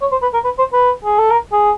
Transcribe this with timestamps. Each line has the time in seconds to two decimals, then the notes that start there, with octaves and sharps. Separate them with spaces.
0.01 C#5
0.12 C5
0.22 B4
0.34 A#4
0.44 B4
0.59 C5
0.73 B4
1.05 G#4
1.19 A4
1.31 A#4
1.52 G#4